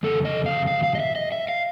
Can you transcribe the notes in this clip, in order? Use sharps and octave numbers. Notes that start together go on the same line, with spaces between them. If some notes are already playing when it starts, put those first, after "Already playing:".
F2 C#3 A4
D#5
F5
F5
F5
D#5
E5
D#5
E5
F5